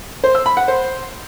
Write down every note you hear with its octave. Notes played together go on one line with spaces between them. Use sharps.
C5
E6
B5
F#5
C5